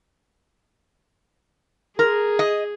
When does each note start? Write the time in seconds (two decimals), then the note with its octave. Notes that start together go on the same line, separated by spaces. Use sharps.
1.99 G#4 A#4
2.39 D#5